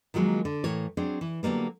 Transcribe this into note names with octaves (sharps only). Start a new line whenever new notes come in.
D#3 F3 F#3 G#3 A#3
D3
A2 E3 A#4 C#5
F#3 C4 D4 G#4
E3
D3 F#3 G3 A#3 B3